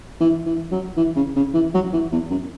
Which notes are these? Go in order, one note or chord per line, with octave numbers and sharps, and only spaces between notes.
E3
E3
F#3
E3
C#3
C#3
E3
F#3
E3
E2
F#2